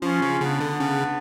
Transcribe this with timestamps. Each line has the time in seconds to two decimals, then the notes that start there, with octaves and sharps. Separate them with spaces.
0.02 F3 C#4 F4
0.22 C#3
0.41 C#3 B3 D4
0.61 D3
0.80 C#3